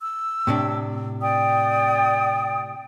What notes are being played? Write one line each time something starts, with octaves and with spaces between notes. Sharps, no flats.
E6
A2 C3 D4
D5 G5 D#6